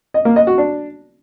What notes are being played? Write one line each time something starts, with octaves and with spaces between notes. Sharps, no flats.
D#5
A#3
D#5
F#4
D4